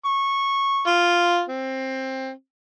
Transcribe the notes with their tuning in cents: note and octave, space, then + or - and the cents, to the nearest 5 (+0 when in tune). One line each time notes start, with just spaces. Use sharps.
C#6 -10
F4 +0
C4 +15